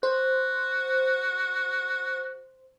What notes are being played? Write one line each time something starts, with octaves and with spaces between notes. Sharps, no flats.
F#4 C5